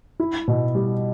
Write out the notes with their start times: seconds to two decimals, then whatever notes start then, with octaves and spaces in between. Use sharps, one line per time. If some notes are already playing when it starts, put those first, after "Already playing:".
0.20 E4
0.48 B2
0.75 G3